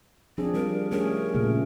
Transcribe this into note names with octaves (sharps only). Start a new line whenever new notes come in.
F3 C4 D4 G#4
G3 A#4
A3 C#4 G#4 A#4
A#2 C#3 A3